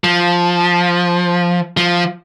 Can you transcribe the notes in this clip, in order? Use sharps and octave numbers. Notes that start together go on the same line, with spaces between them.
F3
F3